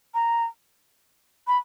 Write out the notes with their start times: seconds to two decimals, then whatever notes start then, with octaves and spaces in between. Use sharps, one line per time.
0.14 A#5
1.47 B5